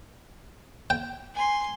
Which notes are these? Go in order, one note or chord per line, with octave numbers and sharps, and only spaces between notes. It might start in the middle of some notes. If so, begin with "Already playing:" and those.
G5
G#5 C6